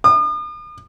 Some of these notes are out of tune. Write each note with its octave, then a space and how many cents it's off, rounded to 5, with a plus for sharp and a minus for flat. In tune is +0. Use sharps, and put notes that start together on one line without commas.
D#6 -45